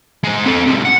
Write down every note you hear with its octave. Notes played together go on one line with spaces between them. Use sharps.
G#3 C5
C4 A4
C3 G#3
F#5